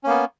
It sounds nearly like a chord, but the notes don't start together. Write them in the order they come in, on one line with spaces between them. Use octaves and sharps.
C#4 A#3 B3